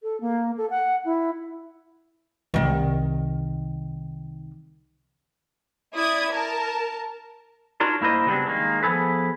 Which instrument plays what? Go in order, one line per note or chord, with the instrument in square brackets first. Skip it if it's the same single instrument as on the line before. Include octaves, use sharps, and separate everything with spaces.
[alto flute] A4
A#3
A4
F#5
E4
[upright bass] C2 D#3
[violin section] E4 D5 D#6 G#6
A#4 A5
[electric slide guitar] D4 D#4 F4 F#4 A#4 C#5
G2 A#3 E4 A#4 C5 D#5
C#3 F#3 G3 B3 C4 D4
D#3 G#3 A#3
F3 B3 G#4 A4 B4